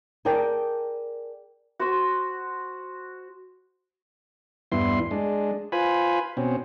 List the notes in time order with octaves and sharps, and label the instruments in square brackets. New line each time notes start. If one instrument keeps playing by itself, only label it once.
[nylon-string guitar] G#4 A#4 D5 G5 A5
[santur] F#4 C5
[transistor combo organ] E2 G2 B3 E4 C6
G#3 D4
F4 B4 C5 G#5 B5
B2 C4 C#4